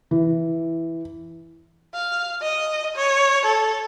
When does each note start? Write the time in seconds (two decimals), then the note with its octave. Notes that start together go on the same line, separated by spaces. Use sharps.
0.11 E3
1.94 F5
2.42 D#5
2.96 C#5
3.45 A4